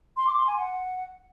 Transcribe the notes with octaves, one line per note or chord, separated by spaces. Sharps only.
C6
D6
C6
G#5
F#5